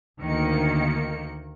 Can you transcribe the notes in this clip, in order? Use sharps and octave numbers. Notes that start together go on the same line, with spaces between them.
D2 D#3 A#3 C#7